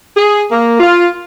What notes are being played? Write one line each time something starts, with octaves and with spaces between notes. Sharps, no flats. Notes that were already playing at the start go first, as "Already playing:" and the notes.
G#4
A#3
F4